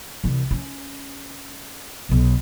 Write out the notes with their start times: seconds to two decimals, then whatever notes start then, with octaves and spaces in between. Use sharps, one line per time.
0.24 C2 E3
0.51 C#4
2.09 B1 B2